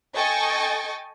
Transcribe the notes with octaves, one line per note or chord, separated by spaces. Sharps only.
A4 D#5 G5 G#5 C#6 A6